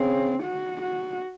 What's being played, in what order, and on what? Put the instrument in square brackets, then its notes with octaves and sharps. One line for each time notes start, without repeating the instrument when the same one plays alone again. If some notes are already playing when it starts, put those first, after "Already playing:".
Already playing: [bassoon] C#3 [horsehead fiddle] C4
[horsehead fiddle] F#4
F#4